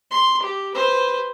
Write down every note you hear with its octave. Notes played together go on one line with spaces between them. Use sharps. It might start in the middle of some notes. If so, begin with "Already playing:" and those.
C6
G4
B4 C5